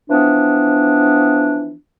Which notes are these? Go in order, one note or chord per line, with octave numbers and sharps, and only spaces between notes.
E3 F3 B3 D4